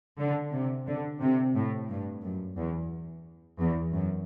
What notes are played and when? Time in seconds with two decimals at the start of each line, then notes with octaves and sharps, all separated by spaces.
0.19 D3
0.53 C3
0.87 D3
1.21 C3
1.55 A2
1.90 G2
2.23 F#2
2.57 E2
3.60 E2
3.94 F#2